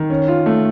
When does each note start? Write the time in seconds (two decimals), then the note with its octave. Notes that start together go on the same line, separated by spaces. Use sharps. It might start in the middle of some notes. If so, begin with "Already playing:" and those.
Already playing: D#3
0.10 C#4
0.28 F4
0.46 A3